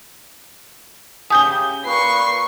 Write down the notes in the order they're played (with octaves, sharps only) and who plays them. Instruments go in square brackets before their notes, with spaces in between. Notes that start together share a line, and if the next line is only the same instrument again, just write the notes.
[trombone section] C#3 C#4 G4 [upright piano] G#5 G7 [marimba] D#6 G6
[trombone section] A#2 F4 B4 [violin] C#6 C7